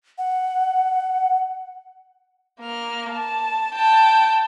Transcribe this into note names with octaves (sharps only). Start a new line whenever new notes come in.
F#5
A#3 F6
A5
G5 A5